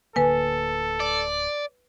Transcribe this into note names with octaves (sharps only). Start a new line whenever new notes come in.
D1 D3 A#3 A4 B4 G#5
D5